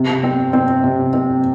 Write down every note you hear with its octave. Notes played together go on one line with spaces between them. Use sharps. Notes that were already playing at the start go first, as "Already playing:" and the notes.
Already playing: C3
C4
C4
C3
C4